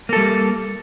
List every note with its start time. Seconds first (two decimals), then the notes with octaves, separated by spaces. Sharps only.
0.09 A#3
0.13 A4
0.16 G3